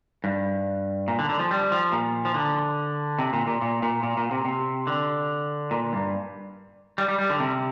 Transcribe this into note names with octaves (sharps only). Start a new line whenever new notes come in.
G2
A#2
D3
D3
F3
G3
F3
A#2
F3
D3
C3
A#2
A#2
A#2
A#2
A#2
A#2
C3
C3
D3
A#2
G2
G3
G3
G3
D3
C3